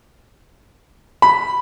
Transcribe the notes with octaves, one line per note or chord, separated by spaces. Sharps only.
B5